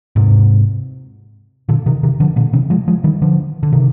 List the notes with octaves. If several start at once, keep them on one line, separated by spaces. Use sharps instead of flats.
G#2 C3
A#2 D3
C3 D#3
C3 D#3
D3 F3
A#2 D3
C3 D#3
F3 G#3
F3 G#3
D#3 G3
D3 F3
D3
C3 D#3